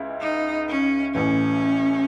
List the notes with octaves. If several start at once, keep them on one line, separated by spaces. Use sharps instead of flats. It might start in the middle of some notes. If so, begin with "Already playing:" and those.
Already playing: C#2 C#3 E4
D#4
C#4
A1 A2 E3 C#4